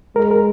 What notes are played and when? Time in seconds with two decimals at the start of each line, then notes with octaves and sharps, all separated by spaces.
0.16 G#3 A#4
0.31 A#4